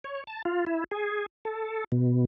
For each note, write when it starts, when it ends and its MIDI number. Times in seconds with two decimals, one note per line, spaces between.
0.04 0.24 73
0.27 0.42 81
0.45 0.65 65
0.67 0.84 64
0.91 1.26 68
1.45 1.84 69
1.92 2.25 47